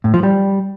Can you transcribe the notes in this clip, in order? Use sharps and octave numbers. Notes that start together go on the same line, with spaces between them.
A2
F3
G3